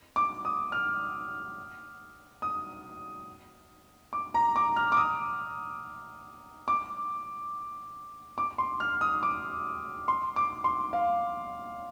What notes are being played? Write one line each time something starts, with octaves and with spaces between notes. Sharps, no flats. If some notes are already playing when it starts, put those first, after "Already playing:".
D6
D#6
F6
D#6
D6
A#5
D6
F6
D6
D#6
D6
D6
C6
F6
D#6
D6
C6
D6
C6
F5